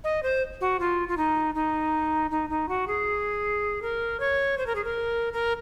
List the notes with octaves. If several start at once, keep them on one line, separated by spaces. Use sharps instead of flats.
D#5
C5
F#4
F4
F4
D#4
D#4
D#4
D#4
F#4
G#4
A#4
C#5
C5
A#4
G#4
A#4
A#4